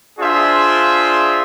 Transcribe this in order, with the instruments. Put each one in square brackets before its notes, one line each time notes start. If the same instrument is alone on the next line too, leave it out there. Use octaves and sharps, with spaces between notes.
[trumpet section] D4 F4 G#4 C5 E5